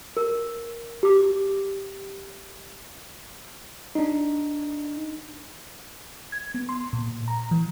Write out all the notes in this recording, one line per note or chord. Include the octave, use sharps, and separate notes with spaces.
A#4
G4 D6
D4 D#4
G#6
B3
C6
A#2
A#5
E3